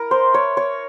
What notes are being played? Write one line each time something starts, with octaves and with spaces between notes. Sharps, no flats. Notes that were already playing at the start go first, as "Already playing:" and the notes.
Already playing: E4 A#4
C5
C#5
C#5